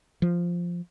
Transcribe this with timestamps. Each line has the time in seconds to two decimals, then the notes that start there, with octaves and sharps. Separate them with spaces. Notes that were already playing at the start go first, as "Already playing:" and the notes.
0.22 F3